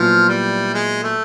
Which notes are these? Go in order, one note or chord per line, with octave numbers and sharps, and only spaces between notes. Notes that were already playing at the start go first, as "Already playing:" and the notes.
Already playing: A#2 F3 F#3 B3 E4
G3
G#3
A3